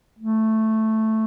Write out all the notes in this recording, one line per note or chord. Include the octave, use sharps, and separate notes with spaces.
A3